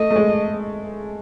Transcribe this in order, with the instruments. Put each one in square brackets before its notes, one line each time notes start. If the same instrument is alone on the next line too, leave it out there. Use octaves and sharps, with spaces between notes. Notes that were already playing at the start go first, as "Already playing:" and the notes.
Already playing: [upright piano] A3 [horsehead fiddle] D#5
[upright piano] A3
G#3